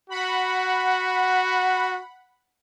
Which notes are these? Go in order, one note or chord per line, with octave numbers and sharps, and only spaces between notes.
F#4 F#5 B5